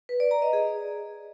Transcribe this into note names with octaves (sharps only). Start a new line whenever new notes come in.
B4
D5
A#5
D#5
G#4